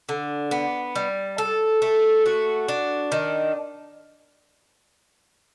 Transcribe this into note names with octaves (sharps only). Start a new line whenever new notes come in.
D3
B3
G3
A4
A3
F#4
D4
D#3